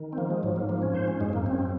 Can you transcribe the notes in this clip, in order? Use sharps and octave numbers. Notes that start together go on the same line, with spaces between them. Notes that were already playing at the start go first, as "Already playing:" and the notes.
Already playing: D#3
C4
F3 A#3
G#3
G#2 F#3
A#3
F3 A#3
C#4
G#2 C5
C#4
F#2 G#3
A#3
F#2 C4
C#4
C4